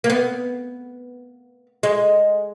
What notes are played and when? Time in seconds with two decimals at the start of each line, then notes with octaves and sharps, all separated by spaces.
0.04 A#3
0.10 B3
1.83 G#3